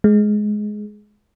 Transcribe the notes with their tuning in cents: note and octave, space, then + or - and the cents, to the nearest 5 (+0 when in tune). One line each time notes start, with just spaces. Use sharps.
G#3 +15